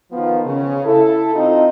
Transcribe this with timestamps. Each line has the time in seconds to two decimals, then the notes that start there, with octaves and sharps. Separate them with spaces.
0.12 D#3 F3 B3 F4
0.45 C#3
0.85 E4 A4
1.34 C4 D#4 F4 D#5